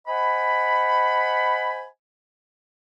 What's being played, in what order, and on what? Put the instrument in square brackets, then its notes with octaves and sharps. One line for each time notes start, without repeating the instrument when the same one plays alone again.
[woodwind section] C5 D#5 F#5 G#5 B5